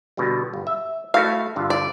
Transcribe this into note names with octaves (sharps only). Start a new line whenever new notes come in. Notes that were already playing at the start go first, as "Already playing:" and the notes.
B2 D3 G3
G1
E5
A3 E4 F#4 F5
G2 D3 F4
D5